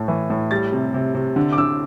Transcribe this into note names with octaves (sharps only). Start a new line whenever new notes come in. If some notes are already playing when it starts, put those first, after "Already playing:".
Already playing: A2 A3
E3
A2
G3 A6
C3
C3
C3
D3
D6
D3 E6